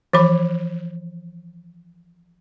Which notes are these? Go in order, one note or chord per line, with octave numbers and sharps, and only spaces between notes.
E3 F3 B5